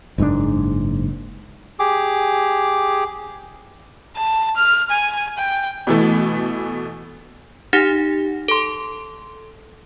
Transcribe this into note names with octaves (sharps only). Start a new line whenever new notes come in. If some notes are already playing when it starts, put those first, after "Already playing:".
F#1 G#2 C3 D4
G4 G#4 D6
A5
F6
G#5
G5
B2 E3 A3
D#4 G4 F#5 A#6
A4 C6